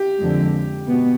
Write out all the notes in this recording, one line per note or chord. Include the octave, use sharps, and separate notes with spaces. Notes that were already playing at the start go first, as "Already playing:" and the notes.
Already playing: G4
F2 D3 F3 G#3
B2 B3